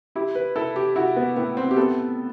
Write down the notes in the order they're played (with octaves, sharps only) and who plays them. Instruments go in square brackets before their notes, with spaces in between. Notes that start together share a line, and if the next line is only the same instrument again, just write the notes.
[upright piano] E4 [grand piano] G4
[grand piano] B4
[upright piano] E4 [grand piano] A4
[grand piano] G4
[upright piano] E4 [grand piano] F#4
[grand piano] B3
[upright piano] A2 [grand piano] B3
[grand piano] C4
G4
[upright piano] B3 [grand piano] A4